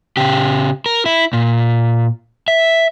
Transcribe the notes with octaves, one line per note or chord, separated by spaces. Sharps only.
C#3 G4
A#4
E4
A#2
E5